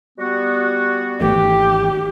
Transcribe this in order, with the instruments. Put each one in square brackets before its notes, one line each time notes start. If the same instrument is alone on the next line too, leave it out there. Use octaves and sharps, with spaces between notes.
[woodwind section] G3 B3 F#4
[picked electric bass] G#1 E3 A3 [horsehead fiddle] G4